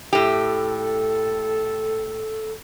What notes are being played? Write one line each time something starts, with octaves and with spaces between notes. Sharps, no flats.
A2 G4 A4